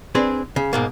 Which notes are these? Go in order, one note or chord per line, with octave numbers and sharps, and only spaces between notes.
C4 D4 G#4 B4
C#3
G#2 B2 A#3